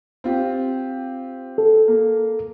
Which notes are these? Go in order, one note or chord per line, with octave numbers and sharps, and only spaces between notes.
C4 F4 G4
A4
A#3